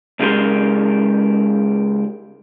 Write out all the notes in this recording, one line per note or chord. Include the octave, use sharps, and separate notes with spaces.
C#2 C#3 G#3 G4 A#4 C6